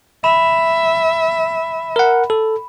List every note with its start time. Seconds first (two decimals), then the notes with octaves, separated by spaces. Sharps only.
0.24 E5 B5 E7
1.96 A#4 F#5
2.30 A4